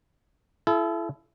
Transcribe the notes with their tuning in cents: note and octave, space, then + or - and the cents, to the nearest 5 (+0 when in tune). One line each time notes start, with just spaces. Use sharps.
E4 +30 A4 -35